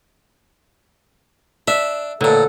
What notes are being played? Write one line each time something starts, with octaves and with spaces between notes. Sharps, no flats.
D4 E5
A1 A#2 D3 A4